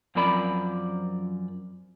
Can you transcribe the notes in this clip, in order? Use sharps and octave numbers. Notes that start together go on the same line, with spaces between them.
F#2 F3 C4 A#4 D5 B5